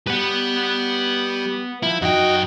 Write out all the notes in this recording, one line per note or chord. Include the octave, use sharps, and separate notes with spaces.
G3 B4 F#5
F3 E4
F#2 D#4 F#4 G5